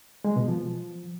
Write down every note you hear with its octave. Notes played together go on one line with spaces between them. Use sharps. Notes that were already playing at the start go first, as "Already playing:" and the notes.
G#3
B2
F3